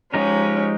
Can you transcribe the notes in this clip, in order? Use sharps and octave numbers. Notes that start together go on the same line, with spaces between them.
F3 G#3 C#4 D#4 G4 A#4